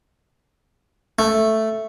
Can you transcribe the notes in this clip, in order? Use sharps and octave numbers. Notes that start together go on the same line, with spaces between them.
A3